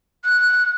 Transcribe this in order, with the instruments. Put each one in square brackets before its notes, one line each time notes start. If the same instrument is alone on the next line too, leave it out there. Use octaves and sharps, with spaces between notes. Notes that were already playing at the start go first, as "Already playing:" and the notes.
[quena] F#6